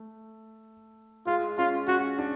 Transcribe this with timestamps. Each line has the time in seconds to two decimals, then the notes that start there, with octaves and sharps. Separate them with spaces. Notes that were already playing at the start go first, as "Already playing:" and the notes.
Already playing: A3
1.27 G#3 F4
1.58 C#4 F4
1.88 C#4 F#4
2.18 D4